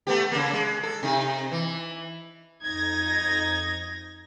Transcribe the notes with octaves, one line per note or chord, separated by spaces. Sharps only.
A3 B3 G4
C#3 A#3
G#3
A4
C3 D#4
E3
F2 D#4 G#6 A#6